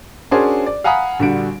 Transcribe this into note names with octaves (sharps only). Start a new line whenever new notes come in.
C#4 D4 F#4 G#4 A#4 C5
D5
F5 F#5 G#5 A#5 B5 D#6
A#1 D3 G3 F#4 D7